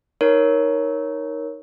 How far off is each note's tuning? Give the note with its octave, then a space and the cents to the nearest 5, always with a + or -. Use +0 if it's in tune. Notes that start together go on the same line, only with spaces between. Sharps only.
D#4 +5 A#4 +10 C#5 +0